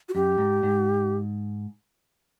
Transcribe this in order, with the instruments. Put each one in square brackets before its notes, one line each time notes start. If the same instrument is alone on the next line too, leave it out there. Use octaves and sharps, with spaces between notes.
[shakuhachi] F#4
[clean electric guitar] F#2 [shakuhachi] G4
[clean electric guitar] G#2
G#2